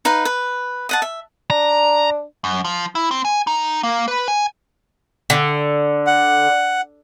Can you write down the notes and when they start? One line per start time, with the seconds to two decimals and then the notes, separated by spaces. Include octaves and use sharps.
0.05 D#4 B4 F5
0.25 B4
0.89 D#5 F#5 A5
1.02 E5
1.50 D4 A#5
2.44 F#2
2.65 F3
2.95 E4
3.11 C4
3.25 G#5
3.47 D#4
3.83 A#3
4.08 B4
4.28 G#5
5.30 D3
6.07 F#5